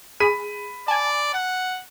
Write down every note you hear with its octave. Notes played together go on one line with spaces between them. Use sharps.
G#4 B5 B6 D#7
D5 G#5 A5
F#5